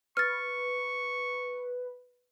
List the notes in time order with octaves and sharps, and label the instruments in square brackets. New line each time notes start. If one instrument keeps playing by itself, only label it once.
[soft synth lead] B4 [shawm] C#6 [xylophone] F6 A6